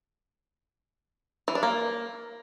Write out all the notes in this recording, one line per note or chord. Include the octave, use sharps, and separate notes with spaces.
E3
D4
A#3